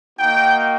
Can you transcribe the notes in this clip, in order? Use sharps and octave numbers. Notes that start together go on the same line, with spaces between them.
A#3 D#4 F#4 G5